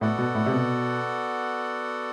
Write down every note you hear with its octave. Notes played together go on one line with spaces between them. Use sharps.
A2 B3 F#4 A4 D5 F#5
B2
A2
C3
B2